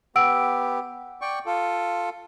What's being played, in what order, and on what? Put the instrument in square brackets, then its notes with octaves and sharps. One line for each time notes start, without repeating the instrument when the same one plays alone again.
[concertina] B3 G4 [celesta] F#5 E6 D7
[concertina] D5 G5 C#6
F4 A4